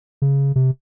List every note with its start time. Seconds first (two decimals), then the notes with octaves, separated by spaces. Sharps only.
0.22 C#3
0.56 C3